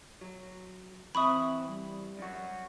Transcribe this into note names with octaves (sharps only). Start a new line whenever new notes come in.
F#3
E3 C4 E5 B5 C#6 D#6
G3
F#2 F#4